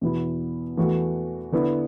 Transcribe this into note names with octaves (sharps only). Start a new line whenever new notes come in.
E2 B2 B3 E4
E2 E3 A3 F#4
D3 B3 E4